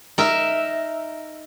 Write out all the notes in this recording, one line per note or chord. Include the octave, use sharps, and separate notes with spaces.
D#4 A#4 E5